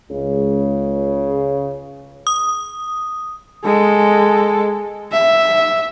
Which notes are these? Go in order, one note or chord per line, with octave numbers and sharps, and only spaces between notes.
C#2 C#3
D#6
G#3 A4
E5